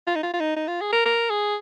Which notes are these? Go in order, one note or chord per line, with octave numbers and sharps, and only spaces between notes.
F4
D#4
F4
F4
D#4
D#4
F4
G#4
A#4
A#4
G#4